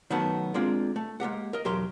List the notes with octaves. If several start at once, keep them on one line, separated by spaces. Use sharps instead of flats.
D#3 F#3 A3 B3 A5 B5
G#3 A#3 C4 D4 F4
A3
G#3 A#3 G4 F#5
A#4 D#5
B1 E2 F#3 G4 A#4 C6